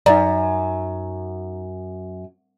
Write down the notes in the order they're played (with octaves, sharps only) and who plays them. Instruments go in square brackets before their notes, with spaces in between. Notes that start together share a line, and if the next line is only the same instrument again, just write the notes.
[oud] F#2 [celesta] D#4 A#5 [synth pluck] D5